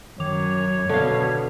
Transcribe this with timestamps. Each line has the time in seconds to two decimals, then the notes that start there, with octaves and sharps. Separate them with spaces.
0.20 F#2 D#3 C#5 D6 F7
0.89 B2 D3 F5